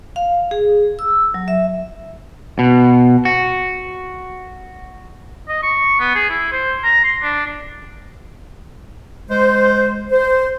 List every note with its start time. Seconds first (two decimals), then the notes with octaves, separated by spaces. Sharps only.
0.16 F5
0.51 G#4
0.99 E6
1.34 F#3
1.48 E5
2.59 B2
3.25 F#4
5.48 D#5
5.63 C#6
6.00 B3
6.15 G#4
6.29 E4
6.52 C5
6.84 A#5
7.04 C6
7.23 D4
9.29 G#3 C5
10.11 C5